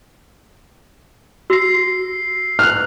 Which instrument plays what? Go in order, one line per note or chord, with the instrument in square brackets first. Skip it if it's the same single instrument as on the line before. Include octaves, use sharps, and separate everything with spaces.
[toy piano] F#4 [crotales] E6 A#6 C7
[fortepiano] F6 F#6